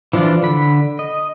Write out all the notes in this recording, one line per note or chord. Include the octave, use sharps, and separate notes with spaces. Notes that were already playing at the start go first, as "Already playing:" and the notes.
E3 F3 D4 F4 D5
D3 B5
D#5